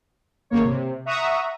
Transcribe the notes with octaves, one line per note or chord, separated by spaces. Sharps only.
G#1 C#3 A#3 C#5
C3
E5 F#5 A#5 C#6 D#6